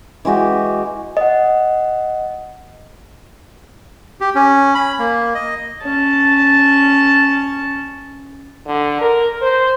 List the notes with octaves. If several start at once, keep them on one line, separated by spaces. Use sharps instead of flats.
E3 G#3 F#4 G4
D#5 F#5
G4
C#4
B5
A#3
D#5
C#4 A5
D3
A#4
C5